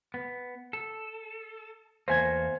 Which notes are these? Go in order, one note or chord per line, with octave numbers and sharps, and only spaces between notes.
B3
A4
E2 A3 A#3 C5 G#5 G#6